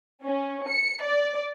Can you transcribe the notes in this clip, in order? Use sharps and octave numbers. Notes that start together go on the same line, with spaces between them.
C#4
C#7
D5